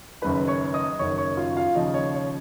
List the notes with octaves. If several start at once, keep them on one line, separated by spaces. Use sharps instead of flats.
F#1 F#2 D#3 B4 B5
C#5 C#6
D#5 D#6
F#1 F#2 D#3 C#5 C#6
C#5 C#6
F4 F5
F4 F5
D#2 C#3 F3 D#4 D#5
C#5
C#5